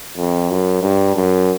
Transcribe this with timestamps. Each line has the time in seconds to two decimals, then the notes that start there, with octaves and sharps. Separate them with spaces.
0.17 F2
0.50 F#2
0.82 G2
1.16 F#2